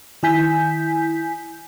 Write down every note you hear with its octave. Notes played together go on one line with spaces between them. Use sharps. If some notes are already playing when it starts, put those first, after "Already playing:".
D#3 E4 G#5 G6 B6